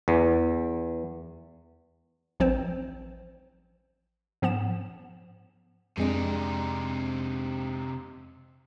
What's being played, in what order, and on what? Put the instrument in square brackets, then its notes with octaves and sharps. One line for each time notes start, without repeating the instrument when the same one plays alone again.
[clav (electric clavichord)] E2
[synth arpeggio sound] A1 F3 C4 C5
G#2 F3 B3 F#5 E7
[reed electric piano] F2 G#3 [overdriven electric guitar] C3 D#4 [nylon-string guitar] C4 D4